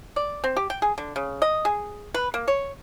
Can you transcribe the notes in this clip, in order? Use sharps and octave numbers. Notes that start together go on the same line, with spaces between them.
D5
C4
G4
G5
G#4
D3
C#3
D#5
G#4
B4
A#3
C#5